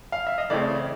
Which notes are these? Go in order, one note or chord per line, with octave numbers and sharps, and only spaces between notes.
F5
E5
D#5
C#3 E3 A3 C4 D5